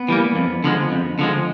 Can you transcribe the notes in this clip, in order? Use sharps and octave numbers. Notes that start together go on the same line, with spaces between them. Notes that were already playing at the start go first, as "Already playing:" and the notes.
Already playing: B3
E3 G3 A#3
F2
D3 F3 G#3
F2
D3 F3 G#3